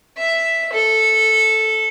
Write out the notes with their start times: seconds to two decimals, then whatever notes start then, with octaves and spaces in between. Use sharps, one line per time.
0.18 E5
0.73 A4